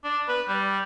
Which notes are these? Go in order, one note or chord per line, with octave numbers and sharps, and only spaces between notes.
D4
B4
G3